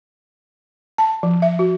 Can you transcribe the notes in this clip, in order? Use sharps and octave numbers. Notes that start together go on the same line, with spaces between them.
A5
F3
E5
F#4